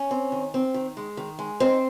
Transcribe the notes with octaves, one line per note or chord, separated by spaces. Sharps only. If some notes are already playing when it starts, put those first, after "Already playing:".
Already playing: C#4 C#5
C4
D#3
C4
D#3
G#3
D#3
G#3
C4 D#4 C5